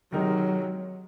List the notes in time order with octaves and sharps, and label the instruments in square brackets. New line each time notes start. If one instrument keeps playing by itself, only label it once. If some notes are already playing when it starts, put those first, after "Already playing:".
[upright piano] C3 D#3 G#3 D#4 A#4 [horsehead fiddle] F#3